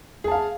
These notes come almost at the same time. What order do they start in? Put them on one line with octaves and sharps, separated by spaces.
G#4 A5 F5